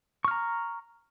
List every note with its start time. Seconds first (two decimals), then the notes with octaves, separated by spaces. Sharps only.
0.25 C#6
0.28 F6
0.31 A#5